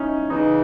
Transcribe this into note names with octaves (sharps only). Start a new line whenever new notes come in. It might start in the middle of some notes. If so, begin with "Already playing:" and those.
Already playing: C#4 D#4 E4
E2 C#3 E3 D#4